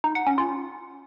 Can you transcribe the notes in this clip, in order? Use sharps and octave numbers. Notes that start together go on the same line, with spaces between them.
D#4
F#5
C#4
F4